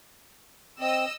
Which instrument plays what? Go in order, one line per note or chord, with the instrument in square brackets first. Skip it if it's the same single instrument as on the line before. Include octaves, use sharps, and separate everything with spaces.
[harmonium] C4 [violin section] D#5 E6